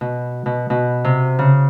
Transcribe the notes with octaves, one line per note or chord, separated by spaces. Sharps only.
B2
B2
B2
C3
C#3